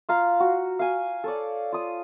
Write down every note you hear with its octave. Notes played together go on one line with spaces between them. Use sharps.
F4 F5 A#5
F#4
F5 G#5
A4 C#5 D5
F4 D#6